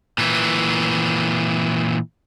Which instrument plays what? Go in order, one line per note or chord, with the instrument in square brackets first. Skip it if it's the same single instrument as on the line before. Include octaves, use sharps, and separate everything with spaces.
[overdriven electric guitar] A#2 E3